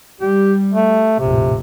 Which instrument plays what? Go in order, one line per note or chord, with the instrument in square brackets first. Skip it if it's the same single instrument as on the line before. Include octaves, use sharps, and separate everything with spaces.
[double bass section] G3 [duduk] G4
[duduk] A3
[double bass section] A#1 F2 A2 [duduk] C3